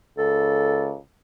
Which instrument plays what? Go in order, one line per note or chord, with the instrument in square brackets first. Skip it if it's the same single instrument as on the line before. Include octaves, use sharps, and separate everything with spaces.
[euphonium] C#2 [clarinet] A4